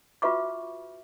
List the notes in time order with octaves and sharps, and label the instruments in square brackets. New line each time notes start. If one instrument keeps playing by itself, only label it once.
[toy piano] F4 F#4 B4 E5 C#6 D6